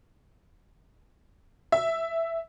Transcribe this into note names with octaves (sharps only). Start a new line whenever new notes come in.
E5